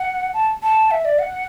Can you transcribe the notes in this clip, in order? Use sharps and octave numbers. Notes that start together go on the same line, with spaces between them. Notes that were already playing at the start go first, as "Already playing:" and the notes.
Already playing: F#5
A5
A5
E5
D5
F#5